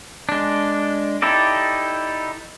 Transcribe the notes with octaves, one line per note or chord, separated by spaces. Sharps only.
G#3 D4
D#4 E4 G4 A4 D5